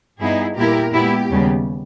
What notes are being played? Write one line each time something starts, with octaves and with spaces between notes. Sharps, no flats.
G2 G3 B3 D#4 E4 G#4
A#2 G3 B3 E4 G4 A#4
A#2 G#3 B3 E4 G4
D#2 C#3 G3 B3